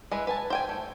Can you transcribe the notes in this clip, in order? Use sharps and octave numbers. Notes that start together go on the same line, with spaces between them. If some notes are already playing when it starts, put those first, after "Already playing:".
G#3 E4 B4
B4 G#5 A5
C5 G5 G#5
A3